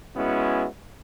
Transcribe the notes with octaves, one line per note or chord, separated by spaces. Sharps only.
G#3 B3 C#4 E4 F#4